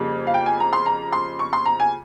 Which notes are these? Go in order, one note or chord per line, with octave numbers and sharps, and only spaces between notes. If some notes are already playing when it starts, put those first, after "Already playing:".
Already playing: F2 C#3 G3 A#3
F5
G5
G#5
A#5
C6
A#5
C6
C#6
C6
A#5
G#5